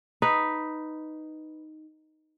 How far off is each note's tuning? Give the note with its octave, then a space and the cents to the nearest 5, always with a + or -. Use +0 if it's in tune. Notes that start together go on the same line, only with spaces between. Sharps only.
D#4 +0 B4 +0